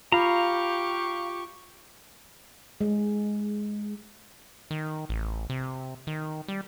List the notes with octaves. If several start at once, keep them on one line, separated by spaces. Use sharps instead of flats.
F4 G4 F5 A#5 B5 C#6
G#3
D#3
A1
C3
D#3
G3